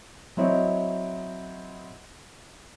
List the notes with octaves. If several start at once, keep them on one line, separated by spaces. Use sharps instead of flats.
F#3 C4 E4 C#5 D#5